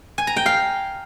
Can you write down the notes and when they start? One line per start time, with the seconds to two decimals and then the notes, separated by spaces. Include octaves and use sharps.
0.18 G#5
0.27 A#5
0.36 G5
0.46 F5